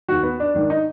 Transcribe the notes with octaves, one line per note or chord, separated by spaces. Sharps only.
D#2 D#3 F#4
B3
D4
G#2 D#3 D4
D#4